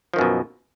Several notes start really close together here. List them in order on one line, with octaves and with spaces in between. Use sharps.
F3 D#3 F#2 B2